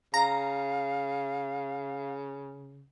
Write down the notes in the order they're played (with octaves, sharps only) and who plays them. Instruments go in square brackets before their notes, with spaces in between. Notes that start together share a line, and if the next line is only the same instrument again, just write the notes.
[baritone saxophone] C#3 [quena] F5 [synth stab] A#5